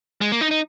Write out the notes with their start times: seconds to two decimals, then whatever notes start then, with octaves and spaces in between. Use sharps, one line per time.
0.21 G#3
0.32 A#3
0.41 D#4
0.51 D#4